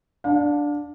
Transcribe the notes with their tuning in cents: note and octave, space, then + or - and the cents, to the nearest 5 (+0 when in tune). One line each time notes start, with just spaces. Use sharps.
D4 +0 F5 +40